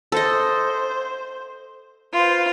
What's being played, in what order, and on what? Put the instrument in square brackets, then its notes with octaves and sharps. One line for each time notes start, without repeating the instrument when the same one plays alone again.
[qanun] A4 D#5 [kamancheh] C5
[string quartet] F4 [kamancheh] B4 C5